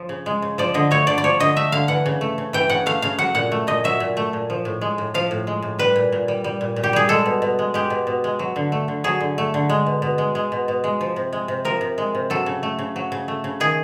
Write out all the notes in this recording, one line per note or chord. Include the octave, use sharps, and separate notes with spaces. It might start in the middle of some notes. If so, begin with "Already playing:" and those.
Already playing: F3
C#3
G#3
C#3
F3 D5
D3 D#5
A3 C#5
D3 D5
D5
F3 C#5
D3 D#5
A3 E5
D3 F5
E3 F#5
C#3
A3
C#3
E3 G5
C#3 F#5
A3 F5
C#3 F5
F#3 F#5
A#2 F#5
A3
A#2 D#5
F#3 E5
A#2
A3
A#2
F3
A2
G#3
A2
F3 F5
A2
G#3
A2
G3 B4
A#2
A#2
G3
G3
A#2
A#2
G4
G3 G#4
G#3 A4
B2
B2
G#3
G#3 G4
B2
B2
G#3
F#3
D3
A3
D3
F#3 G#4
D3
A3
D3
G#3
B2
B2
G#3
G#3
B2
B2
G#3
F3
C3
G#3
C3
F3 A#4
C3
G#3
C3
F#3 A4
C#3
A3
C#3
F#3
C#3
A3
C#3
D#3 G#4